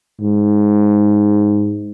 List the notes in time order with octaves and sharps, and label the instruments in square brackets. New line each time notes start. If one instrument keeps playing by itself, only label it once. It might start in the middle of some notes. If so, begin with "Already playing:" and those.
[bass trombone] G#2